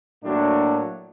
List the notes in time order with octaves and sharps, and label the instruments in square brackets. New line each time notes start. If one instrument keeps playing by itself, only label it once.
[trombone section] A2 F#3 A#3 D4